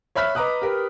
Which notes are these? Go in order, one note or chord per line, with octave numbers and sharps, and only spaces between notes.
C#5 E5 B5 F6 F#6 B6
B4 D#5 A#5 D6 D#6 F#6
G4 A#4 B4